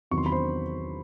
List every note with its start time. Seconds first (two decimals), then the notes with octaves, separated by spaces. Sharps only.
0.11 E2 C3 D#3 F#3 C#6
0.18 C6
0.26 B5
0.32 C5 C6